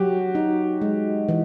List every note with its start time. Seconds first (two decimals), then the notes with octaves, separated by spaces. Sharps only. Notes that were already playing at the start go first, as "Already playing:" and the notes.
Already playing: F#3 F#4 G4
0.35 D#4
0.82 G#3
1.29 E3